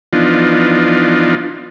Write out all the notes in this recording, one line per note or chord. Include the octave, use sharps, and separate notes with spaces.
E3 F3 B3 D4 D#4 F4